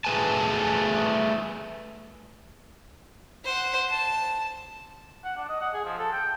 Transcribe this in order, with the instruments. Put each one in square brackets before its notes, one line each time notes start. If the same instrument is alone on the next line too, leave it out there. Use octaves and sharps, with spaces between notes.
[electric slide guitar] A3 G#4 B4 G#5 A5
[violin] C5 F#5
A5
[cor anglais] F#5
D4
D#5
F#5
G#4
F3
A4
G5